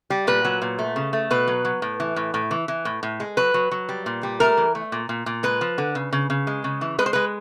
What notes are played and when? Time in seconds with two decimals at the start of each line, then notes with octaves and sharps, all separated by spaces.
0.10 G3
0.27 A#2 B4
0.45 F#3
0.62 A#2
0.79 A3
0.96 C#3
1.13 A3
1.30 B2 B4
1.48 F#3
1.65 F#3
1.82 A2
2.00 E3
2.16 A2
2.34 A2
2.51 E3
2.68 E3
2.85 A2
3.03 A2
3.20 G#3
3.37 F#3 B4
3.54 F#3
3.71 F#3
3.89 G3
4.06 A#2
4.23 G3
4.40 A3 A#4
4.57 E3
4.75 A3
4.92 A#2
5.09 A#2
5.26 A#2
5.43 G#3 B4
5.61 F3
5.78 D3
5.95 C#3
6.13 C#3
6.30 C#3
6.47 G#3
6.64 C#3
6.81 E3
6.98 G#3 B4
7.06 C5
7.13 G#3 B4